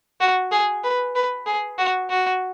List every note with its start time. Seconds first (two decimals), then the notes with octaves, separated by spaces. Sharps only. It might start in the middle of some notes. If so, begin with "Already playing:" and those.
0.21 F#4
0.52 G#4
0.84 B4
1.15 B4
1.47 G#4
1.78 F#4
2.10 F#4